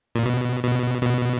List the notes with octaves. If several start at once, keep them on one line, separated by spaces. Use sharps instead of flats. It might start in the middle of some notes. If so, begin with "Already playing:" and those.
A#2
B2
B2
B2